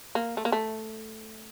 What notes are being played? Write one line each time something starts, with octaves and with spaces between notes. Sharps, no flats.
A#3
A3
A#3
A3